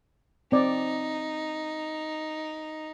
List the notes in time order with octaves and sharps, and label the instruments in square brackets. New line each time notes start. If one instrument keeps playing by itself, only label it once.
[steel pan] C4 D5 [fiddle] D#4